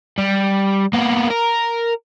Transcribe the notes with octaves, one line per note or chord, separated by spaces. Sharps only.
G3
A#3 B3
A#4